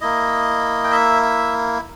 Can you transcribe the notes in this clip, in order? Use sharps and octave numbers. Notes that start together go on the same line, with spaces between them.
A#3 E4 D#5
G5
E5
E5